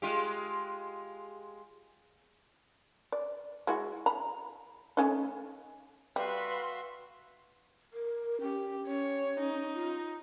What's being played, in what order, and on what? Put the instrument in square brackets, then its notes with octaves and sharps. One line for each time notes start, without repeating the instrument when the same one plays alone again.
[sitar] G#3 F4 G4
[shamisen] D5
G#3 E4 F#4
A#5 B5
A3 C#4 D#4
[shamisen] G3 [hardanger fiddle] F#4 E5 [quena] B4 [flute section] F5 C6
[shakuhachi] A#4
[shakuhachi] C#4 [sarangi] G4
[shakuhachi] C#4 [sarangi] C#5
[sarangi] D#4
[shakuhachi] F4